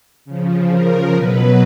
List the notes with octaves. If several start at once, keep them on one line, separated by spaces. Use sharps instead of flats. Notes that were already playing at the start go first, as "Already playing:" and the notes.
C#3 F3
A#4
B2 F#3 B4